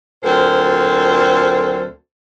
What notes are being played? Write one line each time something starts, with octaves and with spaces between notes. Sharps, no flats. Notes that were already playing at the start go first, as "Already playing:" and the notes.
D2 A#2 F#3 C4 A4 C5